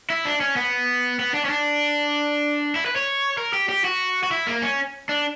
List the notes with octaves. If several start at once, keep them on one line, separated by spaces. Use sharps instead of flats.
E4
D4
C#4
B3
B3
D4
C#4
D4
E4
B4
C#5
A#4
G4
G4
F#4
F#4
E4
A#3
C#4
D4